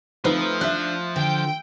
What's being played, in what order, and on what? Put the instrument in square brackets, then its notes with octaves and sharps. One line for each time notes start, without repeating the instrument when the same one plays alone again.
[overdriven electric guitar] F3 [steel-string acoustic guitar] A3 [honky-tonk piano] C4 D#4 B4
[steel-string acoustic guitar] D4 [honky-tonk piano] E5 F#6
[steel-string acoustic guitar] D3 [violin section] G5